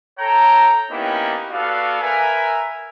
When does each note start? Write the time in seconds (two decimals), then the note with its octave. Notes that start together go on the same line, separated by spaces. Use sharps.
0.19 A4 C#5 G5 A#5
0.90 A#3 B3 C#4 D#4 E4 G4
1.51 B3 F#4 A4 D5 F5
2.01 A#4 B4 E5 G#5 A#5